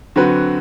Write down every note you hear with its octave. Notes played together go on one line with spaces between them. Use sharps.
D3 F#3 C4 F#4 B4